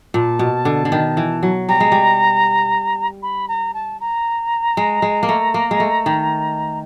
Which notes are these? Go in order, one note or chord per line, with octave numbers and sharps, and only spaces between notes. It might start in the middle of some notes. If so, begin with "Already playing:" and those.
A#2 A5
B2
D3
D3
D#3
E3
F#3
G3 A#5
G#3
G3
B5
A#5
A5
A#5
G#3
G#3
A#3
A3
A#3
G#3
A3
D#3